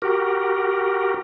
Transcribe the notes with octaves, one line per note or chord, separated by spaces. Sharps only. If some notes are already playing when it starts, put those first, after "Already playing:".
F#4 G4 A#4